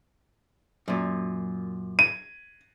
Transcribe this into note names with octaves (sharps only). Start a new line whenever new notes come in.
F#2 A#2
D#7